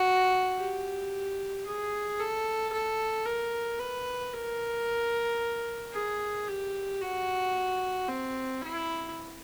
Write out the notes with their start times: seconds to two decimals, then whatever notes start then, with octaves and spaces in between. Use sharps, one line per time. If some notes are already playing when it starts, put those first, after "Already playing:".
Already playing: F#4
0.59 G4
1.66 G#4
2.20 A4
2.73 A4
3.26 A#4
3.80 B4
4.34 A#4
5.94 G#4
6.48 G4
7.01 F#4
8.09 C4
8.62 E4